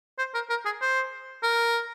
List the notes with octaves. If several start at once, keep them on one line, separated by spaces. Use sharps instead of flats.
C5
A#4
A#4
G#4
C5
A#4